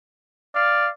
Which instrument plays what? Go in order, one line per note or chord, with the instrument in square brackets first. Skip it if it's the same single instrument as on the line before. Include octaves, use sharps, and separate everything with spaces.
[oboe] D5 [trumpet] F5